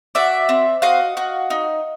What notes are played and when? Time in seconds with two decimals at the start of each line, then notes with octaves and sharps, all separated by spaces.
0.15 F#4 D5 E5
0.49 C4
0.82 F#4 D#5 F5
1.17 F#4
1.50 D#4